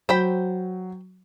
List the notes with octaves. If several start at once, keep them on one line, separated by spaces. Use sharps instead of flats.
F#3 C5 G5 B5